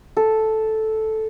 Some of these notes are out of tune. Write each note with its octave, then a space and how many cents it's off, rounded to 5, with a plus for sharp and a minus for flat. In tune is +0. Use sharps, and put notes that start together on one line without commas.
A4 -5